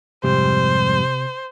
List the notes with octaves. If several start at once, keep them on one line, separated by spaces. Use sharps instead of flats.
F2 G#2 C3 G3 C5